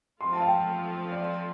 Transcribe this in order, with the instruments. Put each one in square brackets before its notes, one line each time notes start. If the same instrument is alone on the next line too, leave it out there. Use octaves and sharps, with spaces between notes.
[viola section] F3 A3 C4 F4 [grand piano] C6
[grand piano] A5
F5
G5
F5
D5
F5